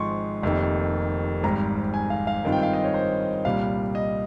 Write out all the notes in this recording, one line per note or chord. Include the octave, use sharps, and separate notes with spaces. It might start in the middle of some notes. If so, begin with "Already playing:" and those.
Already playing: G#1 G#2 F3 G#3 C6 C#6
F1 F2 C3 D#3 A#3
G#1 G#2 G3 A#5
G#5
F5
F5
G2 D#3 G#3 C4 F4
G5
F5
D#5
C#5
C5
C2 A#2 G3 F5
D#5